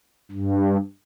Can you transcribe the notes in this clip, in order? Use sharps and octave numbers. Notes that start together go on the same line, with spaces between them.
G2